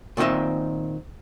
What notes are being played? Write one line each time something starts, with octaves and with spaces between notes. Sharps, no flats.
A#2 D#3 C4 D#5 E5